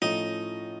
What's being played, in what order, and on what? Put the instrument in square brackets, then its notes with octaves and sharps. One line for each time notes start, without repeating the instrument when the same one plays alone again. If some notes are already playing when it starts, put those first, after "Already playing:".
[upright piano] A2 F3 A3 C#4 F4 [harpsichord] D#4